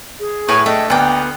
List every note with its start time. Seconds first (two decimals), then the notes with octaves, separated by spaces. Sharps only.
0.20 G#4
0.48 A2 B4 C#5 G#5
0.66 A3 D4 D#5 G5
0.90 D2 A#3 B3 D5 G5